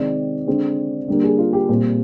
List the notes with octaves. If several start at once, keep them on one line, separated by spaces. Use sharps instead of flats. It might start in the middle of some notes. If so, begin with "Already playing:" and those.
Already playing: C3 D#3 G#3 C4 D5
D3 G#3 C4
D3 G3 A#3
G#4
F4
G4
A#2 G3 C4